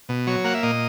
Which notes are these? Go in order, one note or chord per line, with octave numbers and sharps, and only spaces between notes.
B2
F#3 C#5
A#3 F#5
E5
A#2 D#5